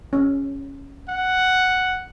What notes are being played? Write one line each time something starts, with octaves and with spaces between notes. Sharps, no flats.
C#4
F#5